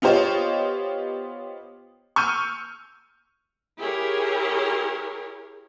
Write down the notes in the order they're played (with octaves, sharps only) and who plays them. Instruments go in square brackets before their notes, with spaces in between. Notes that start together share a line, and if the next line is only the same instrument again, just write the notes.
[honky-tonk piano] B3 F4 G4 C5 C#5 D#5
C#6 E6 F6 G6 D#7
[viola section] E4 G4 G#4 A#4 C#5